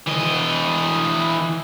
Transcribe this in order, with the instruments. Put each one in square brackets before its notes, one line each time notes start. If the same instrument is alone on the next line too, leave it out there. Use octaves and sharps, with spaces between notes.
[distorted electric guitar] E3 D#5